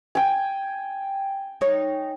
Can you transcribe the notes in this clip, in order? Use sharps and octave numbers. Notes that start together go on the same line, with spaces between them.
G5 G#5
D#4 C#5